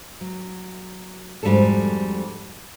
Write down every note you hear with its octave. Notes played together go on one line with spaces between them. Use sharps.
F#3
F2 G#2 G3 D4 F#4 A4